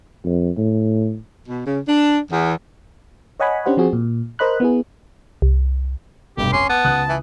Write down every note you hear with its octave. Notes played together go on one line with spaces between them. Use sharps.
F2
A2
B2
C#3
D4
E2
C#5 D#5 F#5 G#5 B5
C#4 D4 G4 C5 F#5
F3 C4 F#4 G#4
A#2
A#4 C5 D#5 B5 F#6
B3 E4 G#4
C2
F1 B1 G2 G4
C#4 C6 D6
B3 A5
C#2 D#6 F#6
E3